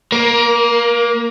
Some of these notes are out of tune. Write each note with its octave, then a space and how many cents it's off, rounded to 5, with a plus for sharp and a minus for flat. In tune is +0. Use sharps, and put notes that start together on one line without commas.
A#3 +0 A#4 +30